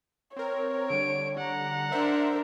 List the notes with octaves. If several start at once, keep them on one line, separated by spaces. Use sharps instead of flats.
C4 A#4 C#5
D3 G3 D7
F#5 A#5
D4 A#4 C5 E5